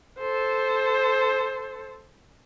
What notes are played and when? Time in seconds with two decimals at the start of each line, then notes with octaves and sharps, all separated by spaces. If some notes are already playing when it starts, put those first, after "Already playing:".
0.18 A4 C5